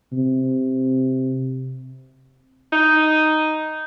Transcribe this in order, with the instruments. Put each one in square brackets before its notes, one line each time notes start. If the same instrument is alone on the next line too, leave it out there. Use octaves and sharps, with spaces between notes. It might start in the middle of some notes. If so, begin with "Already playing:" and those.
[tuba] C3
[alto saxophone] D#4